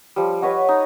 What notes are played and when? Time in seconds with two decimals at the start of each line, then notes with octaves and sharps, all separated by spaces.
0.16 F3 G3
0.42 B4 C#5 D#5 F#5
0.69 D#4